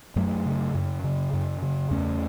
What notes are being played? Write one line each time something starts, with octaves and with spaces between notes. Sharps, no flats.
F#2 F#3 A3
C#3
F#2
C#3
F#2
C#3
E2 A3 C#4